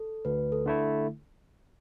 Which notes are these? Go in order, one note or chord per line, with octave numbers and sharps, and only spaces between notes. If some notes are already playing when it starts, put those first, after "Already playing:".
Already playing: A4
D2 B4
A4
D3 A3 E4